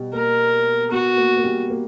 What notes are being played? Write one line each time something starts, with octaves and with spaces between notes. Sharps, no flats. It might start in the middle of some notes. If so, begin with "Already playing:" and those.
Already playing: B2 G3
A#3 A#4
B3 F#4
A#3
A#3
G3
A#3